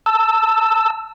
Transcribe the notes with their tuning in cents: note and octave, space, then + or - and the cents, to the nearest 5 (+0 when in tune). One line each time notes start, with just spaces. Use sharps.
A5 +20 E6 +0